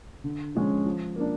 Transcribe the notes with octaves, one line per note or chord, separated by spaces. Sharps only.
D3
F3 G#3 C#4
F3
A#3 D4